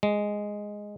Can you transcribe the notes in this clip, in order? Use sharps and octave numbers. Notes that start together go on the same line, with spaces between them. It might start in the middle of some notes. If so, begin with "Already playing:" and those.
G#3